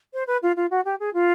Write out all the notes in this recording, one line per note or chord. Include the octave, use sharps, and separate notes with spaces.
C5
B4
F4
F4
F#4
G4
G#4
F4